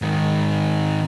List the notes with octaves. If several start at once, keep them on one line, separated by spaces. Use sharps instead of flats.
G#2 D#3